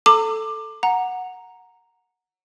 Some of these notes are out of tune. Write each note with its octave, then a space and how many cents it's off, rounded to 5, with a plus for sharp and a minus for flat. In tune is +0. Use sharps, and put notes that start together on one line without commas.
A4 +0 A#5 -40 D6 +20
F#5 -10 A#5 +0